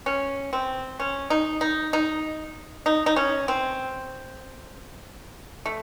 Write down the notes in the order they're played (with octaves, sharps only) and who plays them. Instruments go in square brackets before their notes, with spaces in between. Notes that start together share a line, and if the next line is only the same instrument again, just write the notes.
[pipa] C#4
C4
C#4
D#4
D#4
D#4
D#4
D#4
C#4
C4
A3